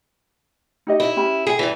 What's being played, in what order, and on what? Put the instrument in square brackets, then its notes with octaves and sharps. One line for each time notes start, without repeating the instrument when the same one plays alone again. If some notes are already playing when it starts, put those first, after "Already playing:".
[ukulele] D#4 G4 D#5
[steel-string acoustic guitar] E4
[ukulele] C#4 G4 B5
[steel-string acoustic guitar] G#4 [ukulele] G5
[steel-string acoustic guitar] G2 E3